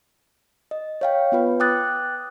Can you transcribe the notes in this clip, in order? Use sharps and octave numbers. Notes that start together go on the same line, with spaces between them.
D#5
C#5 F5 G5
B3 F4 B4
G5 D6 D#6 F#6 A6